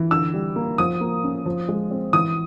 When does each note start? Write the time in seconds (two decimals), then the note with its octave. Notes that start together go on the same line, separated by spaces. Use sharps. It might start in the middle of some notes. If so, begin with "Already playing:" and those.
Already playing: E3
0.11 D3 E6
0.34 G3
0.56 A#3
0.78 F3 D#6
1.01 A#3
1.24 C#4
1.46 F3
1.69 G#3
1.91 C4
2.13 E3 D#6